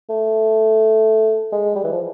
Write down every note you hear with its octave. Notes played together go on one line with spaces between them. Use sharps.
A3
G#3
G3
E3
F3